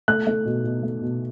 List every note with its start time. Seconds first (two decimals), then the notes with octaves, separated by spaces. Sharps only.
0.08 A3 F#6
0.27 A3
0.45 B2
0.64 B2
0.83 A3
1.01 B2